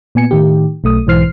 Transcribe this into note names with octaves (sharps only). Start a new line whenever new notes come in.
A#2 B3 G#5 C#7
A2 D#3 G4
B1 A3 D#6
B1 G#2 E3 C5 F6 C7